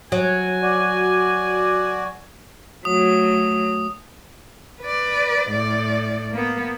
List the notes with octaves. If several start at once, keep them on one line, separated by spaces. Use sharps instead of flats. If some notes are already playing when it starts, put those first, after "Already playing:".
F#3 G#5
F#4 D5
F#3 A3 D#6
B4 D5
A2 D5
A#3 B3